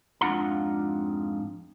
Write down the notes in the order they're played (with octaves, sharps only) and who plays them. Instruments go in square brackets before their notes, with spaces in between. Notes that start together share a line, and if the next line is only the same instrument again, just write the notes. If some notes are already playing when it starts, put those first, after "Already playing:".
[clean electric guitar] F2 G#2 D4 F4 F#5 A#5